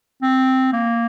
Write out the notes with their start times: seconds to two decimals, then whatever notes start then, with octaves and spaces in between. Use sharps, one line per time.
0.22 C4
0.73 A#3